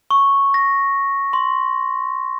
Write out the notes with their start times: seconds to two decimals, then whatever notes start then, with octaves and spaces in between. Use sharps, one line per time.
0.10 C#6
0.54 A#6
1.33 C6